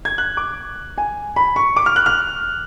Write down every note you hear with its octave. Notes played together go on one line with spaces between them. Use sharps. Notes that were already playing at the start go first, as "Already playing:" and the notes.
G#6
F#6
D6
G#5
B5
C#6
D6
F6
F#6
F6